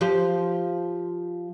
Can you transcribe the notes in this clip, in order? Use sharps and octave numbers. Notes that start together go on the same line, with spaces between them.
F3 G4 C5